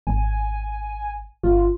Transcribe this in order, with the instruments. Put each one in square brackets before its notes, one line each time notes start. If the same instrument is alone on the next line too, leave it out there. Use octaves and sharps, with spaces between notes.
[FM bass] G#1 [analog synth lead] G#5
[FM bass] G1 [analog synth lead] F4